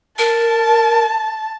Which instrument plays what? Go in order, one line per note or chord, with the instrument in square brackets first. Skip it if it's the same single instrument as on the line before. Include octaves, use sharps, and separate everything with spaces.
[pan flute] A#4 [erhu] A5